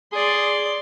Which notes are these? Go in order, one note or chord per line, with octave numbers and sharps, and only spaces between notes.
G#4 D5 C6